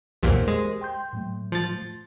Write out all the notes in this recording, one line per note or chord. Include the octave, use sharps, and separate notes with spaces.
B1 E2 A#2 G4 A#4 C5
G#3
G5 C6 G6
A2 F#3 A3
F3 A6